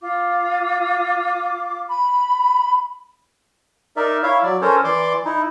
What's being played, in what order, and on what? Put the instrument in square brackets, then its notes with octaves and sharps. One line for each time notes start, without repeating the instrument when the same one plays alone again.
[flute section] F4 D6
B5
[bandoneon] D#4 A#4 D5 E5
E4 C#5 E5 F5
F#3 D5
C#4 A4 A#4 C5 C#5
E3 D5 C6 D6
D#4 E4